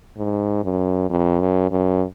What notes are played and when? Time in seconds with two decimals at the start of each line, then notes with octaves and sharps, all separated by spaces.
0.18 G#2
0.64 F#2
1.10 F2
1.40 F#2
1.71 F#2